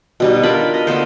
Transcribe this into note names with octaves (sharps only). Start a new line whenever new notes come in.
B2 G3 D#4
D4 F4 A#4 B5
D#5
D3 A#3 B3 C5